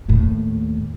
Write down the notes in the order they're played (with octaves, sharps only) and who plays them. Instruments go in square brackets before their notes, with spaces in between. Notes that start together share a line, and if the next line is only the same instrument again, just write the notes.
[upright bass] D#2 A2